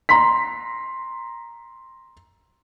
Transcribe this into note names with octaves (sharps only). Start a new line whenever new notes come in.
A#5 C6 B6